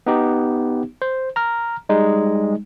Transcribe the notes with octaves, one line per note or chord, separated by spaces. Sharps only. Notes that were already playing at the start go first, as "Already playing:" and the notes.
B3 D#4 G4
C5
A#5 F6
G3 G#3 D#4